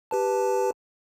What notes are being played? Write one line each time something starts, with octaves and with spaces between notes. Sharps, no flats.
G4 B4 A5